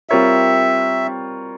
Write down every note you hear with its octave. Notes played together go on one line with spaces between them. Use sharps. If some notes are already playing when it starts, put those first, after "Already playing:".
G3 C4 F4 A#4 C#5 E5